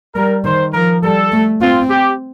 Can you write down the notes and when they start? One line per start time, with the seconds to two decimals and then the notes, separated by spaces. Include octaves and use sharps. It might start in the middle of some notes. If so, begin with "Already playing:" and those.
0.15 G3 A#4
0.44 D#3 C5
0.74 F3 A#4
1.03 G3 A4
1.32 A3
1.62 C4 F4
1.90 G4